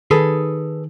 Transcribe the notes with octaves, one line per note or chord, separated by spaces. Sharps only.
D#3 G#4 A4 B4